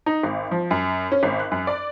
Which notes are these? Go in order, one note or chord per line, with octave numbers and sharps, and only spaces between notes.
D#4
G#1
F3
F#2
C#4
G#1
F#6
F#2
D5